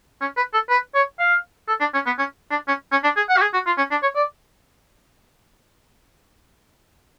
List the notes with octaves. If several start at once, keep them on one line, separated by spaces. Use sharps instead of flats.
C#4
B4
A4
B4
C#5
F5
A4
D4
C#4
B3
C#4
D4
C#4
C#4
D4
G#4
F#5
F#4
G#4
F#4
F4
C#4
D4
C#5
D5